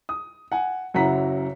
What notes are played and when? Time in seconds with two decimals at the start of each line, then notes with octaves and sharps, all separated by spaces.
0.09 D#6
0.52 F#5 G#5
0.94 F#1 F#2 E4 F#5 A#5 B6